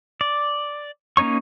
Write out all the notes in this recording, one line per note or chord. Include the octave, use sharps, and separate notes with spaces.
D5
A#3 C#4 D#4 C#5 C#6